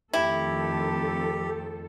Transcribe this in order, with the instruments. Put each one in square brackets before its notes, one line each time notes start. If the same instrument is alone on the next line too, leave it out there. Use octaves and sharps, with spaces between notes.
[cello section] F2 A4 [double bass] D#3 A3 [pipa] E4 [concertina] G4